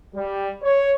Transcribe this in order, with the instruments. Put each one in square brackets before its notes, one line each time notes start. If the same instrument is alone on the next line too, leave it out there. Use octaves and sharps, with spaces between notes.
[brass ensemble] G3
C#5